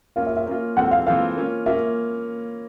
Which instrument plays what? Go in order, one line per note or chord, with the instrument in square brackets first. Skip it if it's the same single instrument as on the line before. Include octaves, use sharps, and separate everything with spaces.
[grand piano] A#3 C#4 F4 [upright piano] F5
[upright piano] E5
E5
[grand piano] A#3 C#4 F4
[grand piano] E3 G#3 C4 F4 A4 [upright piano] F#5
[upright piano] F5
[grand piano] E3 G#3 C4 F4 A4 [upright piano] F5
[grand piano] A#3 C#4 F4
[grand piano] A#3 C#4 F4 [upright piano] E5